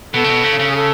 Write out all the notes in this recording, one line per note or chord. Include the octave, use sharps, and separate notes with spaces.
B2 A4
C#3
B2
C#3
C#3
G#4
A4